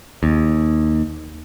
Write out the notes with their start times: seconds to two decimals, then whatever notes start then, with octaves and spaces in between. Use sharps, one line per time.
0.23 D#2